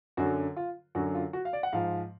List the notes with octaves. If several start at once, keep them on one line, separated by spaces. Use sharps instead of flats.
F#2 D3 F#3 F#4
F4
F#2 D3 F#3 F#4
F4
F#4
F5
D5
F#5
G#2 F3 F5